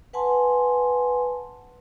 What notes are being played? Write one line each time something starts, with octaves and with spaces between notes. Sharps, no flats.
B4 F#5 G#5 A5 C6